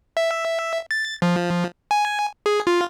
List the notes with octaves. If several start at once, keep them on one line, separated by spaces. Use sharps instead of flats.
E5
A6
F3
G#5
G#4
F4